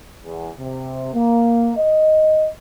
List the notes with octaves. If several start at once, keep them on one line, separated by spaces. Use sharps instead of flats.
E2
C3
A#3
D#5